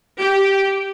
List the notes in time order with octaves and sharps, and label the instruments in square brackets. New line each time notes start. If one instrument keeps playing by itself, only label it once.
[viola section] G4